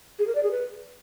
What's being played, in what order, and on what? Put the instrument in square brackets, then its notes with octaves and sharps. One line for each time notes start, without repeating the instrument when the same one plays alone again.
[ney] G#4
A#4
D5
G#4
B4